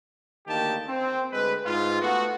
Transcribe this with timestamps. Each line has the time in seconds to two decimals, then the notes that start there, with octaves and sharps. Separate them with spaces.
0.47 D2 D#3 A#3 G4 A5
0.88 C4
1.32 D2 G#3 B4
1.66 G#2 F4
2.01 A3 B3 F#4